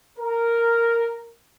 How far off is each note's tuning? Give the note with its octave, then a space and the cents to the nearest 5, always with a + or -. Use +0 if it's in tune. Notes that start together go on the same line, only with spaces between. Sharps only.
A#4 -5